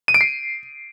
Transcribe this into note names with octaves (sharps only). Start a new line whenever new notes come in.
D#7
D7
C7